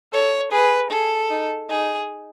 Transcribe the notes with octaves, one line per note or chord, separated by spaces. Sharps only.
A4 C#5
G#4 B4
G#4 A4
D#4
D#4 G#4